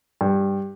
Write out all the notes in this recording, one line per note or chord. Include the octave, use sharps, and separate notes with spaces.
G2